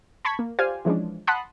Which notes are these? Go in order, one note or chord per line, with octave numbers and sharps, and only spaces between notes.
A5 B5 C#6 G#6 B6
A#3
F4 G4 C5 D5 F5 G#5
E3 F3 G#3 C#4 D4
F#5 A5 B5 C6 D#6 F#6